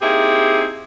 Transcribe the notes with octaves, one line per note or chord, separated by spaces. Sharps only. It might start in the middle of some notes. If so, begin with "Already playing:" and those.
A#3 C4 D#4 E4 G4 G#4